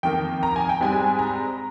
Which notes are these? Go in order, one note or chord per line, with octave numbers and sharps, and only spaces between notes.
F2 D#3 A#3 G5
A#5
G#5
G5
G#2 G3 C4 D#4 G#5
A#5